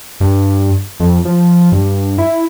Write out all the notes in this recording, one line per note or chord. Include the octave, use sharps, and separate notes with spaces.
G2
F2
F3
G2
E4